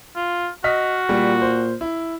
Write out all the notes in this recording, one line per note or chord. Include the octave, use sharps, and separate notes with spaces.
F4
F#4 D#5 F6 B6
A#2 G3
C5
E4